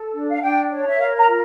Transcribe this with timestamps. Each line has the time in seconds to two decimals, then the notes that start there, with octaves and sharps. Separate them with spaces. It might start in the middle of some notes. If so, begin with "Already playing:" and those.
Already playing: A4
0.12 D4
0.30 F5
0.41 D4 G5
0.70 C#5
0.87 E5
0.98 A#4 F5
1.17 A#5
1.27 F4